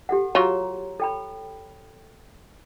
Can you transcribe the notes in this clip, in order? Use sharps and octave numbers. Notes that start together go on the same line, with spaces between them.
G4 A4 F#5
F#3 F4 C#5 A#5
A4 G5 B5